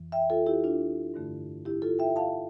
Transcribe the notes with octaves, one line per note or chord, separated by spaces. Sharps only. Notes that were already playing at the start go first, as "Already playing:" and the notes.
Already playing: F2 E3
E5 G5
F4 A4
E4 G4
D4 F4
G2 D3 A3
E4 G4
F4 A4
E5 G5
F5 A5